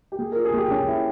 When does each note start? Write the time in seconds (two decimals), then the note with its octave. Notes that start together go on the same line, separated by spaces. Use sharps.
0.12 G4
0.19 A#3 G#4
0.32 A#4
0.36 F4
0.45 G#4
0.54 A#3 G4
0.71 A#3 C#4
0.88 A#3 E4